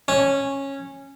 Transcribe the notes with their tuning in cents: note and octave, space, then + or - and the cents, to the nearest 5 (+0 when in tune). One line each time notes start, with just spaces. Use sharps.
C#4 -10